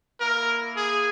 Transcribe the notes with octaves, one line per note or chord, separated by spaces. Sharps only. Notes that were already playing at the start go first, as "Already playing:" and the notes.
A#3 E4 A#4
G#4